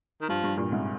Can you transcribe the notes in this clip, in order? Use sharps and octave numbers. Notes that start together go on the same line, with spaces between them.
D#3
G2 F3
G2
G2 A#2
G#2 C3